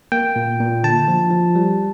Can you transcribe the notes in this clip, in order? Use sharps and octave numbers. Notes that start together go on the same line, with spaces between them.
A#3 G5
A#2
A#2
D3 A5
F3
F3
G3